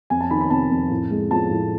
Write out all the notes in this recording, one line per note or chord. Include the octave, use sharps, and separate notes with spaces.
F2 G#5
A5
D#3 B5
B5
C3 A5
F2
A2
G#3
F3 A5
A2